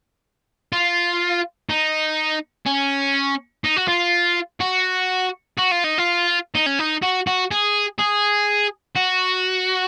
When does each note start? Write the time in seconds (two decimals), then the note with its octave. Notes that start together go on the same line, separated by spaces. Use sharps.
0.73 F4
1.69 D#4
2.66 C#4
3.64 D#4
3.77 F#4
3.88 F4
4.60 F#4
5.58 F#4
5.71 F4
5.84 D#4
5.98 F4
6.55 D#4
6.66 C#4
6.79 D#4
7.02 F#4
7.27 F#4
7.52 G#4
7.99 G#4
8.96 F#4